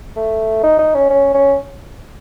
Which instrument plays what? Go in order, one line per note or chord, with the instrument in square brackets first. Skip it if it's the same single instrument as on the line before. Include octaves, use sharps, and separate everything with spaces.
[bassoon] A3
D#4
D#4
C#4
C#4
C#4